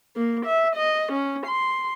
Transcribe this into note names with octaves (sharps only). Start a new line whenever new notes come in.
A#3
E5
D#5
C#4
C6